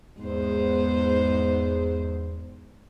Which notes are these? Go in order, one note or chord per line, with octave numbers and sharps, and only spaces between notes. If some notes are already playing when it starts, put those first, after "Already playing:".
E2 G#2 B3 C5